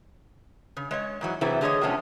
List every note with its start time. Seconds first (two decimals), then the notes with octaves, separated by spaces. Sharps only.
0.77 C#3
0.91 G#3 C#5 D#5
1.21 G#2 E3 F#3
1.41 C3 E3 F#3 C4 E4 G#4
1.61 D3 A3 G#4 A#4 C#5 D#5
1.81 C3 F3 A3 B3 C#4 D4